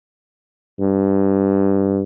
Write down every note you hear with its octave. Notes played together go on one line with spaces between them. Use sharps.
G2